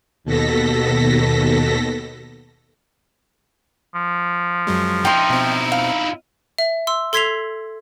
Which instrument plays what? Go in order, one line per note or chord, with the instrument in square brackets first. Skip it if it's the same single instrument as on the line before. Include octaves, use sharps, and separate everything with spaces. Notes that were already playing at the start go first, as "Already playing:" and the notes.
[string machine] D#2 B2 A4 A#6 B6
[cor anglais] F3
[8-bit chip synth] F#2 F#3 G#3
[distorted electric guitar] D#4 E4 [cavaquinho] G5 C6
[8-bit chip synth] B2 C4
[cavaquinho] F5
[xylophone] E5
C6 E6
A4 C6 G#6 B6 C7 F7